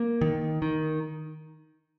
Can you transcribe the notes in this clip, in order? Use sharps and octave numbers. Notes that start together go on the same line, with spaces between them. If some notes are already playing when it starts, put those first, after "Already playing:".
Already playing: A#3
D#3
D#3